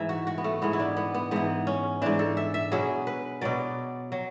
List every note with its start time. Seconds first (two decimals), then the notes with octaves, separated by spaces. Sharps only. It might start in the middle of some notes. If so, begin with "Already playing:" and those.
Already playing: G#2 E3 E5
0.09 F#4
0.27 F#4
0.38 B3
0.44 A3
0.62 G#2 E3 B3
0.73 E4
0.79 D4
0.97 B3
1.15 B3
1.31 G#2 E3 B3
1.67 C#4
2.02 G#2 E3 D4
2.19 A4
2.37 E5
2.54 E5
2.72 B2 F#3 G#4
3.07 B4
3.41 B2 F#3 D5
4.12 F#3